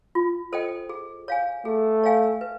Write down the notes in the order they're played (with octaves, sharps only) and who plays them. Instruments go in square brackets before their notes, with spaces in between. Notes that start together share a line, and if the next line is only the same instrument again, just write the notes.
[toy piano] F4
A4 C5 D#5 G5
G#4
C#5 F5 G#5
[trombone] A3 [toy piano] G#4
[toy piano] C#5 F5 G#5
B4